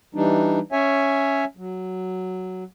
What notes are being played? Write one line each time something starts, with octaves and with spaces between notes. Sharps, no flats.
E3 G3 D4 D#4
C#4 C#5 E5 G#5
F#3